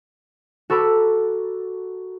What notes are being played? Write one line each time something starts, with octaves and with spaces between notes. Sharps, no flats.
F#4 A4 A#4 B5 D6